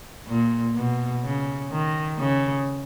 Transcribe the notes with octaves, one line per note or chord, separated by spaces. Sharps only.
A#2
B2
C#3
D#3
C#3